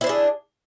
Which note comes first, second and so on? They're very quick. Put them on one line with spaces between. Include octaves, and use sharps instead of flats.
E4 C5 D4 G#4